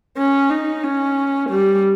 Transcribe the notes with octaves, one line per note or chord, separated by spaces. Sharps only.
C#4
D#4
C#4
G3